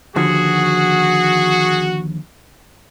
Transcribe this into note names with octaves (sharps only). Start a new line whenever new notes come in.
D#2 D3 F3 F#4 G#4